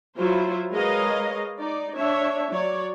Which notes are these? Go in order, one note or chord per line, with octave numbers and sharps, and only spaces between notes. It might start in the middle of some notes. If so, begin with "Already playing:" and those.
F#3 E4 F4 C5
G#3 A#4 B4 C#5 D#5 F5
D#4 D5
D4 C#5 E5
F#3 C#5 D5